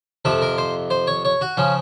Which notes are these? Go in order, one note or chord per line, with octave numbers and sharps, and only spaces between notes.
F2 C3 F3 A4
A#4
C5
C5
C#5
C#5
F#4
C#3 F3 C#4